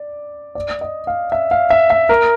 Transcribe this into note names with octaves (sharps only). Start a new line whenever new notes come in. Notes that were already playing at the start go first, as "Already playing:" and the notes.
Already playing: D5
D5
D#5
F5
E5
F5
E5
E5
A#4